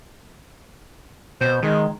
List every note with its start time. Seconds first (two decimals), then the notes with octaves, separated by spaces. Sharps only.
1.41 B2 C5
1.63 D#3 G#3